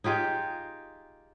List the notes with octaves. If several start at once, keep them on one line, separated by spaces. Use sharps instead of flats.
D#4 F4 G4 G#4